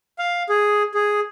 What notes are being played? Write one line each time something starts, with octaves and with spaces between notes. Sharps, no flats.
F5
G#4
G#4